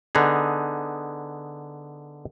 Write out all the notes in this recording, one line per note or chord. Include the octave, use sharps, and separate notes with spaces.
D3 B3 D#4 G#4